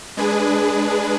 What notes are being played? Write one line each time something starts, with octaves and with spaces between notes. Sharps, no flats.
G#3 D4 G#4 B4